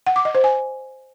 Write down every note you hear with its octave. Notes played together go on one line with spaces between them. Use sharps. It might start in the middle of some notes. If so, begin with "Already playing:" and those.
F#5
D6
D#5
C5
G#5